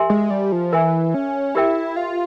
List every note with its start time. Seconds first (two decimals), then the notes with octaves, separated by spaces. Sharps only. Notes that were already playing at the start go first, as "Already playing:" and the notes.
Already playing: G4 A#4 E5 G#5 C6
0.10 G#3
0.30 G3
0.52 F3
0.73 E3 A#4 E5 G#5
1.14 C#4
1.55 E4 G4 A#4 E5 G5
1.96 F4